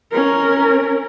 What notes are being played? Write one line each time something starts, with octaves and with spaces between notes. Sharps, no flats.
C#4 A#4